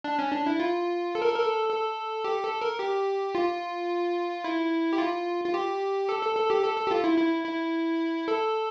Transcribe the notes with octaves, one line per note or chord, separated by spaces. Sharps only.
D4
C#4
D4
E4
F4
A4
A#4
A4
A#4
A4
A4
G4
A4
A#4
G4
F4
E4
G4
F4
F4
G4
A4
A4
A4
G4
A4
A4
G4
F4
E4
E4
E4
A4